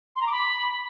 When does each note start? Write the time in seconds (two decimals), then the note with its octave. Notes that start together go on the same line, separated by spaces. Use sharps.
0.16 C6
0.21 A#5
0.27 D6
0.32 B5